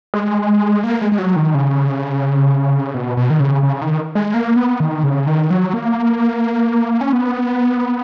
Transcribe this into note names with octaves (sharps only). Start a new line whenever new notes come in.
G#3
A#3
G#3
G#3
F#3
D#3
C#3
B2
B2
D#3
C#3
C#3
D#3
G#3
A#3
B3
D#3
C#3
D#3
F#3
A#3
C#4
B3